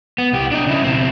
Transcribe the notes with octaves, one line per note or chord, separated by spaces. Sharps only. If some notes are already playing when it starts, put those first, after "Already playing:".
B3
C2 G4
D4 D#5
C#3 E4
B1 C4